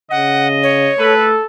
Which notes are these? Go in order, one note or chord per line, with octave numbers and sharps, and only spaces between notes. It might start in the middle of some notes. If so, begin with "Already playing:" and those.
C#3 D#5 F#5
C#5
A3 A4 B4